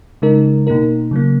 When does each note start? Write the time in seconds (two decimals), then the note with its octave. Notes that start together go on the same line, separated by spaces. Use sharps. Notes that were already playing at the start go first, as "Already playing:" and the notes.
0.22 C#3 G#3 D#4 A#4
0.67 B2 A#3 D#4 A#4
1.11 C#3 F#3 A#3